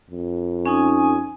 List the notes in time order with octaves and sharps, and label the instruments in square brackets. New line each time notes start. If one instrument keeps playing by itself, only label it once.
[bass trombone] F2
[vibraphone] C#4 D#4 D#6 [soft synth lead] G#5